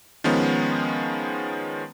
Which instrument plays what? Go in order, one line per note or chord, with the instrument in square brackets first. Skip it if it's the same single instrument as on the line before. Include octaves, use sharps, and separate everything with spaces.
[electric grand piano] D#3 F3 G#3 B3 C#4